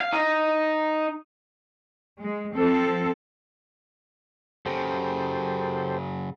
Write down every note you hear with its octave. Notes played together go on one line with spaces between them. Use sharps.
F5
D#4
G#3
F3 C4 A4
F#2 C#3 G4 A4 C5